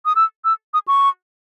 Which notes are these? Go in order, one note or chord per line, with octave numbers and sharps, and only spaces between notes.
D#6
E6
E6
D#6
C#6